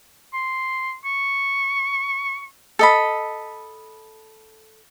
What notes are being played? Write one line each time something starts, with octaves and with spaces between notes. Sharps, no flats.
C6
C#6
A4 D#5 B5